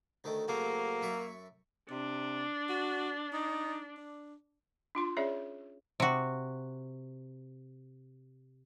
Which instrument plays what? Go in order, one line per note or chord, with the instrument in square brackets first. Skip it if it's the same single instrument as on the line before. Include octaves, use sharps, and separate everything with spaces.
[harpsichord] D2 D#3 A3
[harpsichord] C#3 A3 C4 [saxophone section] F#3 A#3
[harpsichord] F#2 E5 C#6
[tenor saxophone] C3 [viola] D4
[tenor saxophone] F#4
D#4
D4
[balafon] D4 F4 C6
C#4 G#4 C#5 D5 E5
[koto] C3 F#4